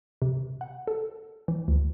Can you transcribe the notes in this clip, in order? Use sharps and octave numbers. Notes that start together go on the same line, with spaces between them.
C3
F#5
A4
E3
D2